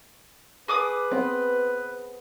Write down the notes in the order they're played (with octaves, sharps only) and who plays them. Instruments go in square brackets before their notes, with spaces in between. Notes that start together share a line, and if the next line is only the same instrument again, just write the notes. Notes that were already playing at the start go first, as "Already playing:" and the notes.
[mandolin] G#4 D6 D#6 [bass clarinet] B4
[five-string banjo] B3 C4